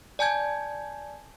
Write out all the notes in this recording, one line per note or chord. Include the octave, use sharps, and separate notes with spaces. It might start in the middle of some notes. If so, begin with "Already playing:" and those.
D5 G#5 A5 G6 G#6